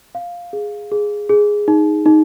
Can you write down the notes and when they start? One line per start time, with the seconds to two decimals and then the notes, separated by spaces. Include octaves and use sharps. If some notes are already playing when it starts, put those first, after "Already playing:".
0.15 F5
0.53 G#4
0.92 G#4
1.29 G#4
1.68 D#4
2.06 D#4